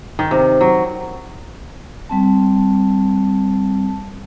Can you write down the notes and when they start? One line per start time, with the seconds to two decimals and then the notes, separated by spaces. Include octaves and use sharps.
0.19 D#3
0.31 C3
0.61 F#3
2.09 G3 C4 A5